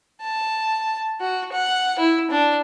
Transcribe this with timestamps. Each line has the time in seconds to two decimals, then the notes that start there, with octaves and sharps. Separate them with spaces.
0.22 A5
1.21 F#4
1.52 F#5
1.99 E4
2.31 D4